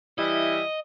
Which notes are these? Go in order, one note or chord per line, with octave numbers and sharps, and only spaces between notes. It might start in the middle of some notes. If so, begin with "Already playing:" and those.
E3 G3 E4 D#5